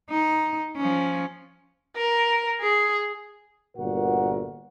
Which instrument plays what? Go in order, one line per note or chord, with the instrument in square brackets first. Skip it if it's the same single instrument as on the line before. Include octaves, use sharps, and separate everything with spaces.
[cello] D#4
F3 C#4
[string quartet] A#4
G#4
[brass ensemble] G1 A#2 F#4 A#4 F#5